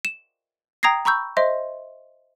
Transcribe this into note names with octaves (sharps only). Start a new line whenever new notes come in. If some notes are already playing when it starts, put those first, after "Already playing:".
E7
G5 A#5 D#6 G#6 A#6 C7
A#5 B5 C#6 E6 G6
C5 D#5 E5 C6